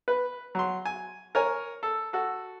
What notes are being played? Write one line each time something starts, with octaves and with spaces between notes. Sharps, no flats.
B4
F#3 C6
G#5
A#4 C#5 G#5
A4
F#4 A4